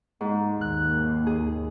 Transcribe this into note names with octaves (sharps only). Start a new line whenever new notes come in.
G#2
D#2 F#6
G#4